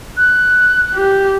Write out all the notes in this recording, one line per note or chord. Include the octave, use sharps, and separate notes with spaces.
F#6
G4